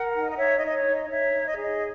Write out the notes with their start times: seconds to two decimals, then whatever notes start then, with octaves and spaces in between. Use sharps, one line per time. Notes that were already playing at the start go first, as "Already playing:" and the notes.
Already playing: A#4 F#5
0.14 D#4
0.29 D#5
0.37 D#4 C#5 E5
0.56 D#5
0.61 D#4
0.66 D#5
0.73 C#5
0.85 D#4
0.92 D#5
1.09 D#4 C#5 E5
1.33 D#4
1.45 D#5
1.52 C#5
1.57 G#4 D#5